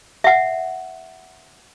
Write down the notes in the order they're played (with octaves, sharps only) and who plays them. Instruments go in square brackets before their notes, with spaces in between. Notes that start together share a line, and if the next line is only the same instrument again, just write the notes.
[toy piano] E5 F#5